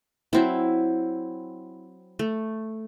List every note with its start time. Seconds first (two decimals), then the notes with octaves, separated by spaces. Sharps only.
0.33 F#3 C4 E4
2.19 A3